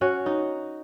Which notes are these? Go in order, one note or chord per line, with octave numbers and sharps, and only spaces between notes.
C#4 F#4 C#5
D#4